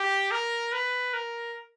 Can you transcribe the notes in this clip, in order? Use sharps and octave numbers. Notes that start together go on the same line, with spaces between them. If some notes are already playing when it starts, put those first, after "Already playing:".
Already playing: G4
A#4
B4
A#4